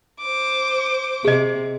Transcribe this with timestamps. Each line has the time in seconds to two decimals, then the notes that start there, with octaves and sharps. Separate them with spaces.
0.21 C5 D6
1.25 C3 G#4 D#5